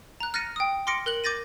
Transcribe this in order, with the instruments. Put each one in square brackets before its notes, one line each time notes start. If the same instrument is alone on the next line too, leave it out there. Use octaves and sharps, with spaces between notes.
[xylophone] A#5 F#6
F6 F#6 A6 A#6 C#7 D#7
G5 D#6
C6 D6 F6 A#6 C#7 D7
A#4 F#6 F#7
D6 G6 A6 A#6 D#7